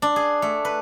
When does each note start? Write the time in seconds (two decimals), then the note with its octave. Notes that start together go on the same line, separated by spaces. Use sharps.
0.02 D4
0.16 G#4
0.42 A3
0.65 B4